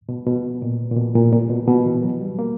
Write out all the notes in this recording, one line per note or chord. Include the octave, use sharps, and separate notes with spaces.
B2
B2
A#2
A#2
B2
A#2
A#2
B2
B2
E3
F#3
G3
A#3